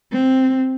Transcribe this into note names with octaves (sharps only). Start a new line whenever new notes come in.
C4